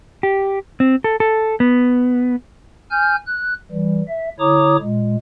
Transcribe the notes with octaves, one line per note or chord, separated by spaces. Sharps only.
G4
C4
A4
A4
B3
G#5 F6 G6
F#6
E3 G3
E5
D3 E4 C#5 A#5 D6 D#6
A#2 G#3